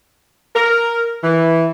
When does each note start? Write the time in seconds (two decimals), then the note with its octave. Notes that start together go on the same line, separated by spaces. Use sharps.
0.56 A#4
1.24 E3